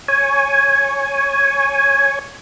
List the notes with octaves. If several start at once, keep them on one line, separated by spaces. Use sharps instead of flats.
C#5 G#5